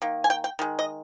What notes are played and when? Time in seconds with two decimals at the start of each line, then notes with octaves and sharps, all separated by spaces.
0.02 D#3 A#3
0.24 G#5
0.30 G5
0.44 G5
0.59 D#3 G#3
0.79 D#5